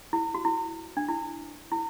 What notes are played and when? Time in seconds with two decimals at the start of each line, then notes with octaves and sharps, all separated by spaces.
0.13 E4
0.35 F#4
0.45 E4
0.97 D4
1.09 E4
1.72 E4